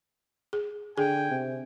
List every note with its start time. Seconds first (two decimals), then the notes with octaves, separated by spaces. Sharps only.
0.53 G#4
0.98 D3 G#4 G5 G#5
1.31 C3